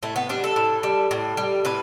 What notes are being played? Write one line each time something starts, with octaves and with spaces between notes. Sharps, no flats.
A2 A3
B3
G3 D4
A4
A2
G3
A2
G3
A2 B4